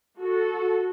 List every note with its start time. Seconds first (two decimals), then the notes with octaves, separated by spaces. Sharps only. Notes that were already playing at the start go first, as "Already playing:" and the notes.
0.19 F#4 A4